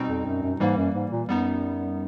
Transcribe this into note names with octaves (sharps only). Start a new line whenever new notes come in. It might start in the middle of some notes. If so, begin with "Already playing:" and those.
Already playing: B2 G3 C4 D#4
F2
F#2
F#2
G#2 E3 G3 A#3
F#2
G#2
A#2
F#2 G3 B3 D#4